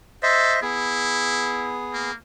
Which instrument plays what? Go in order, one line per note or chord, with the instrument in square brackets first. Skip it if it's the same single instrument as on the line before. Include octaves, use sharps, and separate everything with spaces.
[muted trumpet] A4 [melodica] C5 D#5 E5
[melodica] B3 G#4 [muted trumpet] E4
[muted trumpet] A#3